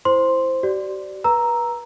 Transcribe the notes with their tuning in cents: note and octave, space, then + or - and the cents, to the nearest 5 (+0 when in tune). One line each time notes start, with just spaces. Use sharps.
E4 +0 C5 +0 C6 +0
G4 -45 D5 +0
B4 -30 A#5 +0 E6 +0